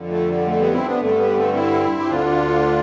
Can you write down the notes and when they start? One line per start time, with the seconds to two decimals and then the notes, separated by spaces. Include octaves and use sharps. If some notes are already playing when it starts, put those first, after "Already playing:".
Already playing: F2 D3
0.10 A3
0.28 G3
0.46 A3
0.59 G3 B3
0.73 C4 E4
0.86 B3 D4
1.00 G2 D3 A3
1.18 G3 B3
1.36 A3 C4
1.54 C4 E4
1.99 G4
2.08 D2 D3 D4 F4